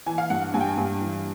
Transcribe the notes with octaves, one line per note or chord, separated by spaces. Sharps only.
E3 G#5
F5
G2 F#5
G2 G#5
G5
G#5
G2
E3